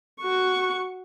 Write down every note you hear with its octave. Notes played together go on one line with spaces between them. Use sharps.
F#4 C#6